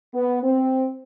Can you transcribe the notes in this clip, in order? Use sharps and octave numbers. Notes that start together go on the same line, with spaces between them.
B3
C4